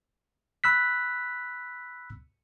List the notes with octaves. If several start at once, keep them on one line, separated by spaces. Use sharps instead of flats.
B5 E6 F#6 B6